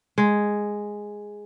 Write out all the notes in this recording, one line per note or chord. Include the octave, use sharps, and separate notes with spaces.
G#3